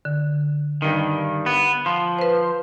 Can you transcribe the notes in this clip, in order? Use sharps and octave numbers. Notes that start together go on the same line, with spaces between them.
D3
G2 D#3
B3
F3
B4 C5